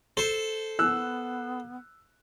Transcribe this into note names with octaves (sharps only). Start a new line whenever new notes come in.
A4 C5
B3 E6 F#6